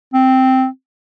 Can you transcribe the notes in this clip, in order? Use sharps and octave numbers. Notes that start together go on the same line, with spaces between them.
C4